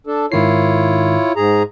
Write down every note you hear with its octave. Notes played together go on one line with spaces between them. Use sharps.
D4 A4
G#2 D#3 E4 F4 C#5 C7
G#2 G#4 A#5